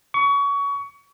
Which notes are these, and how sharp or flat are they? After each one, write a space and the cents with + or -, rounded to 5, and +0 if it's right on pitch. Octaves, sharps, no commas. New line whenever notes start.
C#6 +25